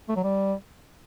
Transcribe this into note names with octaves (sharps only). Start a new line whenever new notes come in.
A3
F#3
G3